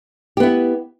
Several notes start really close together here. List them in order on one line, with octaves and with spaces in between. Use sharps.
G4 B3 E4